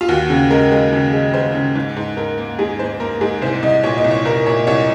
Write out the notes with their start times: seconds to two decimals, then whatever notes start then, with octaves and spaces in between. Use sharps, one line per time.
0.01 F4
0.08 D#2 F#4
0.30 C#3
0.50 G#3 A#4
0.72 G#3
0.93 C#3
1.13 G#3
1.33 G#3 C5
1.55 C#3
1.75 G#2
1.96 G#2
2.17 G#2 A#4
2.38 A#3
2.59 G#2 G#4
2.79 G#2 C5
3.00 A#3 A#4
3.21 G#2 G#4
3.42 C2 C5
3.63 C2 D#5
3.83 A#2 C#5
3.97 D#5
4.04 C2
4.11 C#5
4.25 C2 A#4
4.46 A#2 C#5
4.67 C2 C#5